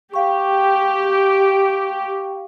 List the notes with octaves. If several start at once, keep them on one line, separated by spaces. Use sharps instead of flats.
G4 F5 G5 C#6